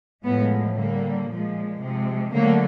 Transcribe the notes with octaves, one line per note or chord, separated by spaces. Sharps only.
A2 F3 G#3 B3
D3 G3 A#3
A#2 F3 G#3
C3 F3 G#3
D3 F#3 A3 A#3